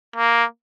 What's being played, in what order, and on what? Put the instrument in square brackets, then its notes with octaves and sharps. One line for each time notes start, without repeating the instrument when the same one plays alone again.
[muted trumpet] A#3